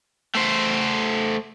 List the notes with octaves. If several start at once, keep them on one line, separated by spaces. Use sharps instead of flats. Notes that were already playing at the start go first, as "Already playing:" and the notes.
A3 C5